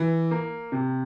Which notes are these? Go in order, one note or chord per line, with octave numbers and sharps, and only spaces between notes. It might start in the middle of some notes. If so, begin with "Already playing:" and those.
Already playing: E3
A#3
C3